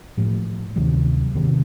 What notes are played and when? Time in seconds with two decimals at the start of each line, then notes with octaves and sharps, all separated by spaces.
0.17 A2 F3 A3
0.76 D2 C3 D#3 F#3
1.34 E2 C3 D#3 F#3